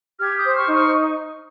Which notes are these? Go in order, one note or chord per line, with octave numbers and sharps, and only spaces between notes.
G4 F6 G#6
D#6 G6
C5
C#6 F6
D#4
C#6 F6